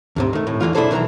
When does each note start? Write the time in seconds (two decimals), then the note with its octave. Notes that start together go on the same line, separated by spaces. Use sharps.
0.16 D2 G#2 C3
0.33 D#3 A3
0.47 A2
0.61 E2 D3 E3 F4
0.75 B1 D4 E4 G#4 A4 C5
0.91 B1 D#3 E3 D4 A#5